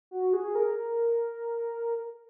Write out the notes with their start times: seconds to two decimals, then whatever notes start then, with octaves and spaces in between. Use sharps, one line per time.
0.11 F#4
0.33 G#4
0.55 A#4